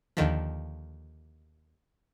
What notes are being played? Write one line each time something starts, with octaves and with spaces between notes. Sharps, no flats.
D#2 D3 D#3 F3